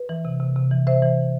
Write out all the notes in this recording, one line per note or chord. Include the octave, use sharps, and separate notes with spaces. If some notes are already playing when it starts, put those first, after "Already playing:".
Already playing: B4
E3
C3
C3
C3
E3
C3 C5 E5
E3